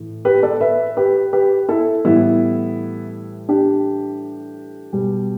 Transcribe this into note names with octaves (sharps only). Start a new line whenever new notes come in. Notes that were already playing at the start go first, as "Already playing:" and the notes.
Already playing: A2 E3
G4 B4
A4 D5
B4 E5
G4 B4
G4 B4
E4 A4
A2 E3 G3 B3 E4
D4 G4
B2 G3